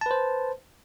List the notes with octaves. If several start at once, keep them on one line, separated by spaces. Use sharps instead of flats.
B4 C5 A5